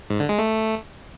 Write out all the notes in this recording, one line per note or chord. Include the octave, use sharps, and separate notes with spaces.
G#2
D3
G#3
A3